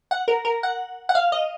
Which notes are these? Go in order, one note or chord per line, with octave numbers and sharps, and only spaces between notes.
F#5
A#4
A#4
F#5
F#5
F5
D#5